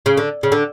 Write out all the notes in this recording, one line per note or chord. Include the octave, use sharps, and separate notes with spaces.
C#3
D3
C#3
D3